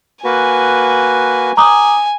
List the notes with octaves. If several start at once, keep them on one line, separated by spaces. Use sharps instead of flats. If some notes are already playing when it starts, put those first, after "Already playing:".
A#3 F#4 B4 G#5
G#5 A#5 D6 D#6